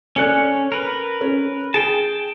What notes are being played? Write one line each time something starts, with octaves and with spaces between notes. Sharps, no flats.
C#4 A4 D5 G#5 F#6
A#4 B4
C#4
G#4 G5 A5